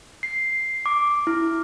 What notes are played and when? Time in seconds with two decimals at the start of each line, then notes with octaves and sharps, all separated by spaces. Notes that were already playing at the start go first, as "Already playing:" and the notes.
0.23 C7
0.86 D6
1.27 E4